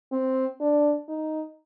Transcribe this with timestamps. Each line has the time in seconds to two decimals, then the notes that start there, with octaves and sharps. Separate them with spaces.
0.12 C4
0.61 D4
1.09 D#4